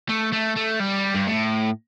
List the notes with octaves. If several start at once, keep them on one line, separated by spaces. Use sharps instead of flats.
A3
A3
A3
G3
G2
A2